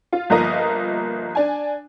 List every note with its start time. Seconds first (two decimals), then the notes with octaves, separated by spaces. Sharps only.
0.13 F4
0.30 G1 F3 A#3 D#5 A#5
1.35 D4 G#5